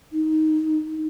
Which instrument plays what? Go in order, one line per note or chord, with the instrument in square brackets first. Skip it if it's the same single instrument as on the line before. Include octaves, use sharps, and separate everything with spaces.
[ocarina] D#4